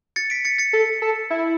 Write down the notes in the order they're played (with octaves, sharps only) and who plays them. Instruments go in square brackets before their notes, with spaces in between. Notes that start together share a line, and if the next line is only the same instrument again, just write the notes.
[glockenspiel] A6 C#7
B6 D7
A6 C#7
A6 C#7
[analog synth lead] A4
A4
E4